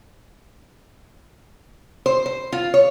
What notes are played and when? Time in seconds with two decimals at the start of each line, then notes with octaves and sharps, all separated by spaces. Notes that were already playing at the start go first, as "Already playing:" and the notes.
2.06 C5
2.26 C5
2.52 F4
2.74 C#5